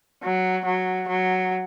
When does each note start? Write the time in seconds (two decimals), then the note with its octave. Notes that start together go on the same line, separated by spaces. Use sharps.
0.23 F#3
0.65 F#3
1.08 F#3